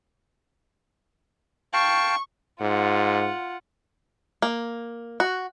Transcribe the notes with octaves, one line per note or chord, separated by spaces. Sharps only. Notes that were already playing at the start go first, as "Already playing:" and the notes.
F5 G5 A5 C#6
G#2 F4 F#5
A#3
F#4